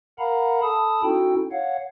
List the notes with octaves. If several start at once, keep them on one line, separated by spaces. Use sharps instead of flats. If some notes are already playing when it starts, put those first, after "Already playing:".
A#4 F5 F#5 A#5 B5
A4 A5 B5 D#6
C#4 D#4 E4 F#4 A4 G5
C#5 F5 F#5